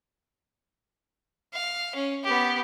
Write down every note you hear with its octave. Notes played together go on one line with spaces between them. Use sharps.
F5
C#4
B3 G4